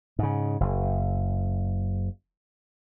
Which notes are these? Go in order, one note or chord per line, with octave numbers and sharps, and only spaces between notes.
G#2 C#3
F#1